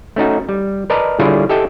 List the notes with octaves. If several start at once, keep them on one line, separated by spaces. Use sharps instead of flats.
A3 C#4 D#4 F#4
G3
A#4 B4 D5 D#5 A5 A#5
D3 G3 E4 F4 G#4 C#5
G4 A4 D#5 E5 G5 A5